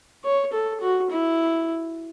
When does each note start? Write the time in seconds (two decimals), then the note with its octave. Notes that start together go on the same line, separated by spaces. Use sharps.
0.24 C#5
0.53 A4
0.81 F#4
1.10 E4